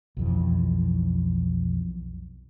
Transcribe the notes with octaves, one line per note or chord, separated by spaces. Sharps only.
B1 F2 E3